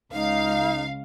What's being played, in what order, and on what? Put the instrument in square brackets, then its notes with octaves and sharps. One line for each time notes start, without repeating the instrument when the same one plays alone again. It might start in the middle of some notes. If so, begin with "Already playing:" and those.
[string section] C#2 F5 [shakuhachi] D#4